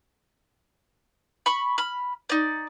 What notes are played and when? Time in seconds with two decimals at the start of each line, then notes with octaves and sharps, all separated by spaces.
1.46 B5 C#6
1.78 B5 F6
2.29 D#4 D5